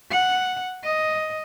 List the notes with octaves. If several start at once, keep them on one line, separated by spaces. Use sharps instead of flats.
F#5
D#5